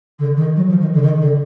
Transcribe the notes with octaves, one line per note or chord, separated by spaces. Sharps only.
D3
D#3
F#3
F3
D#3
D3
D#3
D3